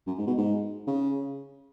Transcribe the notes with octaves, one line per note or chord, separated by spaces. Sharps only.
F#2
G#2
B2
G#2
C#3